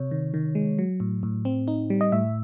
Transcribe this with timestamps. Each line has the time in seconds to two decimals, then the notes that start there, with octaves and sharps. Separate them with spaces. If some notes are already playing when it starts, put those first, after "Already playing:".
Already playing: C3 C#5
0.11 D#3
0.34 D#3
0.55 G#3
0.79 F#3
1.00 A2
1.23 A2
1.45 C4
1.68 D#4
1.90 G3
2.01 D#5
2.12 A2 E5